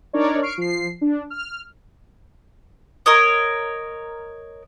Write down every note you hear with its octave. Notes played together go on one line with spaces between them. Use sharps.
D4 D#4 A#4 C#5 D5
C#6 F6 C7 D7
F3 C7
D4
F6
A#4 C#5 D#5